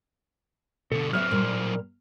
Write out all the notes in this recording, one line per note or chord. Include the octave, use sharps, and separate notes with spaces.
B2 D3 A4
F#3 C4 B4 D#5 E5 F6
A#2 G3 A#3